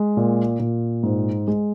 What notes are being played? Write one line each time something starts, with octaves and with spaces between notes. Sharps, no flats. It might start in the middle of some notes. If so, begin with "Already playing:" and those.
Already playing: G#3
A#2
A#2
G#2
G#3